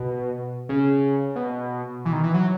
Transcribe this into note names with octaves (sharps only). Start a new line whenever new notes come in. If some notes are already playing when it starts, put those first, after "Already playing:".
Already playing: B2
C#3
B2
E3
D#3
E3
F#3